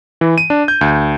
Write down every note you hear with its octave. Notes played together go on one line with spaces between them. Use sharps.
E3
D#7
D4
G6
D2